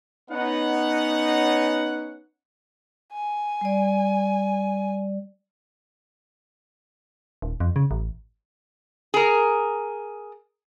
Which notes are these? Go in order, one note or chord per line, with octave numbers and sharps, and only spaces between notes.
B3 C#4 D#4 F#5
G#5
G3 D5
D#1
F2
C#3
A1
G#4 A#4